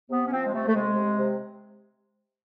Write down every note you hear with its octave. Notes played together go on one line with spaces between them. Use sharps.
C3 B3
C#4
F3 C4
G#3
C3 A3
A3
C3 G#3
C3
C3